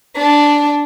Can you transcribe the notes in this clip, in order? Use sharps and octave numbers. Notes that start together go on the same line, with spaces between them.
D4